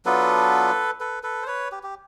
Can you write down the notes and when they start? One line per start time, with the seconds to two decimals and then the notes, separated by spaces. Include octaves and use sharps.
0.05 F#3 B3 D4 F4 A4 B4
1.00 A4 B4
1.23 A4 B4
1.42 C5
1.47 B4 C#5
1.72 G4
1.83 G4